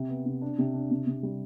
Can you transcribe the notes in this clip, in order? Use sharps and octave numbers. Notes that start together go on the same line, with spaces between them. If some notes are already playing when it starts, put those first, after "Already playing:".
Already playing: C3
B3
C3
D4
C3
D4
C3
C3
G3